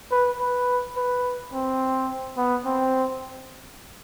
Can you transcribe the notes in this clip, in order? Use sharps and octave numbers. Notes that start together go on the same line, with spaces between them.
B4
B4
B4
C4
B3
C4